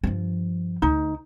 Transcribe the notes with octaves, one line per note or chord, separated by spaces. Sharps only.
G2 F3
D2 D#4